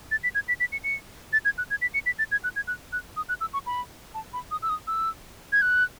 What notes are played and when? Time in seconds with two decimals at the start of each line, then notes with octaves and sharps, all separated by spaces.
0.11 A6
0.23 B6
0.35 G#6
0.48 B6
0.60 B6
0.72 C#7
0.84 C#7
1.33 A6
1.45 G#6
1.58 F#6
1.70 G#6
1.82 B6
1.94 C#7
2.06 B6
2.19 A6
2.32 G#6
2.44 F#6
2.56 G#6
2.68 F#6
2.93 F#6
3.17 D#6
3.29 F#6
3.41 E6
3.53 C#6
3.66 B5
4.14 A5
4.33 B5
4.51 D#6
4.62 E6
4.69 D#6
4.87 E6
5.52 G#6
5.62 F#6